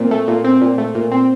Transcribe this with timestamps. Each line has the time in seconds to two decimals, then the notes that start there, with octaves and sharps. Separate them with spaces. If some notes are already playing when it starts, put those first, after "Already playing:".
Already playing: A#2 C4
0.11 A3
0.28 A#2
0.44 C4
0.61 A#2
0.78 A3
0.95 A#2
1.12 C4